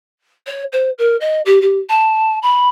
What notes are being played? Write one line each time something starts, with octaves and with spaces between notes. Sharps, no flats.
C#5
C5
A#4
D#5
G4
G4
A5
B5